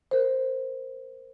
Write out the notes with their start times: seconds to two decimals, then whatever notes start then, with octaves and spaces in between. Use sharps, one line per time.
0.11 A#4 C5